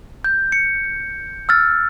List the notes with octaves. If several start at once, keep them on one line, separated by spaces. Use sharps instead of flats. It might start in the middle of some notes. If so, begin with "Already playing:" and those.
G6
C#7
E6 F6 A6